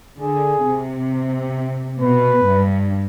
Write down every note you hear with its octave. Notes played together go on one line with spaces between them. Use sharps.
D3 G#4
C3
B2 B4
G2